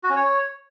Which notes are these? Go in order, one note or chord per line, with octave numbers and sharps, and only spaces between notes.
F#4
C#4
C#5